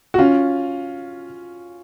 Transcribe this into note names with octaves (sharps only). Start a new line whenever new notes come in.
F#4
C#4 F4